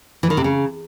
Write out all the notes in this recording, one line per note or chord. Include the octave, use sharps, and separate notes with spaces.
E3
D#3
C3
C#3